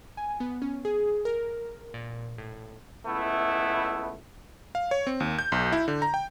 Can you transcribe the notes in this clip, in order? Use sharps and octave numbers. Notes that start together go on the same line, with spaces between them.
G#5
B3
C#4
G#4
A#4
A#2
A2
C#2 A3 B3 E4
F5
C#5
C4
D#2
G6
B1
E4
D3
A#5
G5